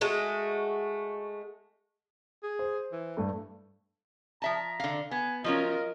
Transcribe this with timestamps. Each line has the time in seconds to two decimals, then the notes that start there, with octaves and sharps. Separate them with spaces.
0.01 G#3 A3 F#4
2.43 G#4
2.59 C5
2.92 E3
3.17 G2 A3
4.42 F3 E5 A5 A#5
4.80 D3 F5
5.11 B3 G#5
5.44 F3 F#3 C#4 F4 A#4 D#5